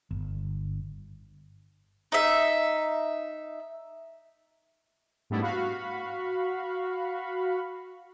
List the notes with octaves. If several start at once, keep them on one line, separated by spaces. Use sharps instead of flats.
G1
D#4 E5
G#2 G3 A3 B3 D4 E4
F#4 F5 B5 C#6